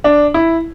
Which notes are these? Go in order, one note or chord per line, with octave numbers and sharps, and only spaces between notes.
D4
E4